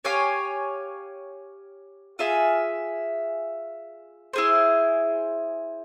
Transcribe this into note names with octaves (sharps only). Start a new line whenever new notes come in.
G4 C#5 F5 G#5
F4 G#4 E5 G#5
E4 G#4 C5